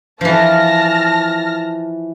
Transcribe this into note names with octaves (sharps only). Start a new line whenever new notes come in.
E3 F3 A5 F6 A#6